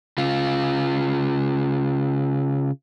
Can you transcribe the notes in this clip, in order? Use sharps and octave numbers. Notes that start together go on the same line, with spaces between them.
C#3 F4